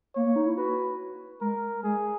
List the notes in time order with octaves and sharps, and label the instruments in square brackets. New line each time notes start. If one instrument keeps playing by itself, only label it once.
[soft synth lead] A#3 [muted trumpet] C#5
[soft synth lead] A#3
D#4
E4
[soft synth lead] F#4 [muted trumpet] B4
[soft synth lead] G#3 [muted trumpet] A#4
[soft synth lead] G#3 [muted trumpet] G#4